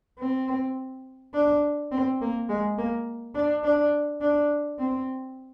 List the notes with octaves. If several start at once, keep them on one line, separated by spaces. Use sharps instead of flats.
C4
D4
C4
A#3
G#3
A#3
D4
D4
D4
C4